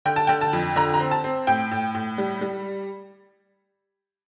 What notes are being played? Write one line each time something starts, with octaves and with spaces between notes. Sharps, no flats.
D3 G5
A5
D3 G5
A5
F2
D3 A#5
A#5
C4
A5
C4
A2 G5
A2
A2
G3
G3